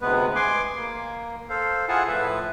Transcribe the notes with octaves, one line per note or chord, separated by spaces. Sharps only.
D2 C3 G#3 B3 B4
G#5 C6 D6
A#3
A4 C5 F5
E4 F4 G#4 F#5 G#5 A5
A2 F3 B4 E5